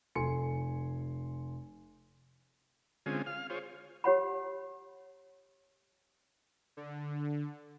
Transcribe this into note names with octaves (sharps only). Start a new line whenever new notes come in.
F1 A4 G#5 C6 C#7
D3 G#3 C4 C#4 F4 G#5
F5 F6
F4 G#4 C5 C#5
G4 C#5 F#5 B5
D3